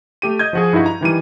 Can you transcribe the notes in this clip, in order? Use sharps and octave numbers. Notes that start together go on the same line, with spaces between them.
A3 G4 D#7
D#5 G6 G#6
F3 F#4 G#4
G2 D#4 E4 F#4
A#5
D#3 E3 G3 D#7